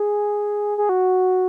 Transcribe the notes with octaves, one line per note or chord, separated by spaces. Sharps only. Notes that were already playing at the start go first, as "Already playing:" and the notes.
Already playing: G#4
G#4
F#4